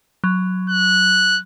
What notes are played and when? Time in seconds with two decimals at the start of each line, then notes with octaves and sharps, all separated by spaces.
0.24 F#3
0.69 F#6